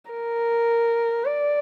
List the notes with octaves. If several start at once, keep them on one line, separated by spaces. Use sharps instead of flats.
A#4
D5